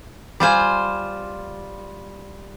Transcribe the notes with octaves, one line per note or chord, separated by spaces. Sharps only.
G3 F4 C5 G#5